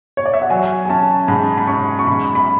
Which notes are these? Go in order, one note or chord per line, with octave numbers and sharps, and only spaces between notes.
C#5
D5
E5
F#5
F#3 G#5
G#5
C#4 A5
G#2 B5
B5
C#4 C#6
C#6
G#2 B5
B5